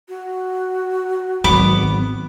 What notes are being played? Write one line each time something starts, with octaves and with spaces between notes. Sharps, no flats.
F#4
G#1 D#3 F#3 B3 D6